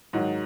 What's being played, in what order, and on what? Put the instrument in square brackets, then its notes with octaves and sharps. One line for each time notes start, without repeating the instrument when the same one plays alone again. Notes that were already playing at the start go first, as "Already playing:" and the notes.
[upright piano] G#2 D#3 F#3